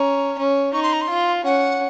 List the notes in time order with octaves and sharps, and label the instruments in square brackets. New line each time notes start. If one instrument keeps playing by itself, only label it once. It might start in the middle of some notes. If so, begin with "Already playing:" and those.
Already playing: [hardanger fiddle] C#4 [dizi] A#5
[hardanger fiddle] C#4
[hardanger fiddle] D#4 [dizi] C#6
[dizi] C6
A#5
C6
[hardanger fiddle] F4
[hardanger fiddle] C#4 [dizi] F#5